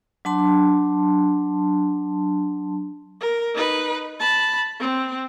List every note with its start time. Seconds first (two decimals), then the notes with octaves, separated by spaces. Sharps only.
0.25 F#3 D4 A5 C6
3.21 A#4
3.55 D#4 B4
4.20 A5 B5
4.80 C4